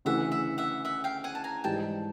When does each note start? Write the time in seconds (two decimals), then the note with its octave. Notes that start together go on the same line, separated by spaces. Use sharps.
0.05 D2 C#3 E3 E5 F#5
0.32 E5 F#5
0.58 E5 F#5
0.85 E5 F#5
1.04 F5 G5
1.24 F#5 G#5
1.35 A5
1.44 G#5 A#5
1.64 G#2 E3 G3 G5 A5